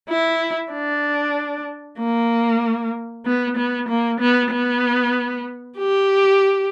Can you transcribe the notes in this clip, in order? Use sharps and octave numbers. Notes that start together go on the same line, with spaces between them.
E4
D4
A#3
B3
B3
A#3
B3
B3
G4